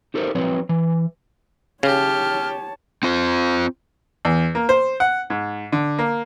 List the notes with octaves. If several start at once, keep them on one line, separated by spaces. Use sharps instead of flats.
D#4 G4 A4 A#4 C5
F3 F#3 C4 B4 C#5
E3
C#3 G4 C#5 A5 F6
C4 F4 C5
E2
A#3
C5
F#5
G#2
D3
A#3